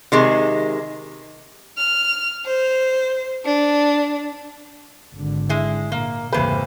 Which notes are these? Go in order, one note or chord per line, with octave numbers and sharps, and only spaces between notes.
C3 D#3 G#3
F6
C5
D4
G#1 D3
G#3 E4
A#2 A#3
F1 G#2 C#3 E3 A#3 B4 C5